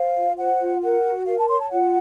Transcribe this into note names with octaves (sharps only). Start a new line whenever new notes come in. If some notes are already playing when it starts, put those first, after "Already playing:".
Already playing: C5 F5
F4
C5 F#5
F4
A#4 F#5
F#4
A#4 F5
A5
C#5 C6
A5
F4 F#5